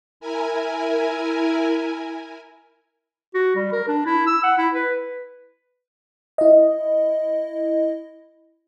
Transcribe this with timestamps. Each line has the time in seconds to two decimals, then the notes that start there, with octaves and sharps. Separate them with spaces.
0.20 E4 A#4 G#5
3.34 F#4
3.56 G3
3.73 A#4
3.88 D4
4.06 E4
4.27 E6
4.43 F#5
4.58 E4
4.74 B4
6.38 E4 D#5